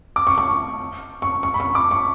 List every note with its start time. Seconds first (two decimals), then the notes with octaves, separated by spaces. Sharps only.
0.16 D6
0.27 C#6
0.38 C#6
1.22 C#6
1.43 C#6
1.54 B5
1.60 C#6
1.75 D6
1.91 C#6